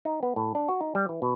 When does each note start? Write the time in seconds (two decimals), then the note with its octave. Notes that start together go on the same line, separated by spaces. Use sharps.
0.05 D#4
0.23 B3
0.36 A2
0.55 D4
0.68 F#4
0.81 D#4
0.95 G3
1.09 E3
1.22 B2